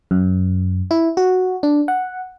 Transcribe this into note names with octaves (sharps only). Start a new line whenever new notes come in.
F#2
E4
F#4
D4
F#5